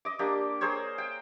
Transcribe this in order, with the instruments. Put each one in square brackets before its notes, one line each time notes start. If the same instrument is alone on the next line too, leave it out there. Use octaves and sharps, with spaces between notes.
[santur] D#5 D6
A#3 D4 G4
G#4 A#4 C5 C#5
G5